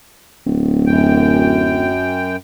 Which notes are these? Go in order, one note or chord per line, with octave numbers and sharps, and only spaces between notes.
D1
F#2 G5